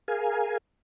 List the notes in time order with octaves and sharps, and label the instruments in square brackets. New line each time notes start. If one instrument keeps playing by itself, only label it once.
[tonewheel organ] G#4 A#4 F5 G#5